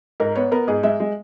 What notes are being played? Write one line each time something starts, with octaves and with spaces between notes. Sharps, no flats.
G#2 A#4
B3 C#5
B3 A#4
G#2 G#4
G#3 E5
G#3